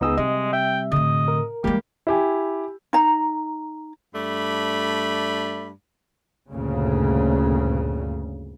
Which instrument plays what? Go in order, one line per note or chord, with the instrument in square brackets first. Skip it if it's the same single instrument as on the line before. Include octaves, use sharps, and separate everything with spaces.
[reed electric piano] C#2 B3 E6 [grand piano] D#4 G#4 [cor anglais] D#5
[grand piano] C3 [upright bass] G3 [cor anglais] G#3 [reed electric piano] D#5
[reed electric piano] E5 [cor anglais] G5
[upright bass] A2 D3 [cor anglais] D#5
[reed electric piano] A#4
[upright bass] E3 G#3 [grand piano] G3 A#3 [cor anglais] G4
[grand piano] E4 G4 G#5
[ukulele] D#4 A#5
[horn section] G2 A3 D5 B5
[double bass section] D2 G2 A#2 C#3